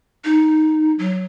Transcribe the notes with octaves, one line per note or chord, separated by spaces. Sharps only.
D#4
F#3